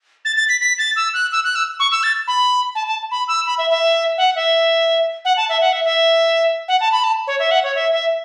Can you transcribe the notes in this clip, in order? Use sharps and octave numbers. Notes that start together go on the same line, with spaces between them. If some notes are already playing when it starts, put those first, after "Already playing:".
A6
A6
B6
B6
A6
E6
F#6
E6
F#6
E6
C#6
E6
A6
B5
A5
A5
B5
E6
B5
E5
E5
F#5
E5
F#5
A5
E5
F#5
E5
E5
F#5
A5
B5
A5
C#5
E5
F#5
C#5
E5
E5